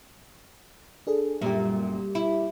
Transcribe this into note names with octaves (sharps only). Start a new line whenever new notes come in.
D4 G#4 A4
F#2 A#2 G3 A3 G4
E4